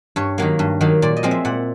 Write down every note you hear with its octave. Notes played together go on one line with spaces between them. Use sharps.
G2 C#5
D#3 F#3 A#3
G2
D#3 F#3 A#3
A#2 D5
D#5
F3 G#3 C4
E5
A#2 F#5